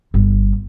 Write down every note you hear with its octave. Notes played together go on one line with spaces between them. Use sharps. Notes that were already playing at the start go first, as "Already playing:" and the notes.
G1